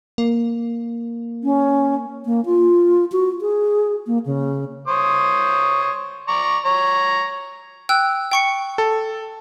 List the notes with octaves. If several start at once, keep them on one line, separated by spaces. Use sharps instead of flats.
A#3
C#4
A#3
F4
F#4
G#4
A#3
C#3
C5 C#5 D#6
D5 A#5 C#6
C#5 A#5
G5 E6 F#6
G5 C#6 C#7
A4